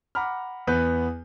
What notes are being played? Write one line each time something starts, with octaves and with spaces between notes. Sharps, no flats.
F#5 A#5 B5 D6 F6
E2 B3 B4 G6